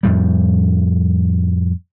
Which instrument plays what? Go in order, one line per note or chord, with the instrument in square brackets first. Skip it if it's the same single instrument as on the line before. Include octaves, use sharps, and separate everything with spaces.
[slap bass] F2 A2 G3